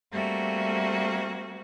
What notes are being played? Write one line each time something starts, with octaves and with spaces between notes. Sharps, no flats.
G3 A3 A#3 C4 F#4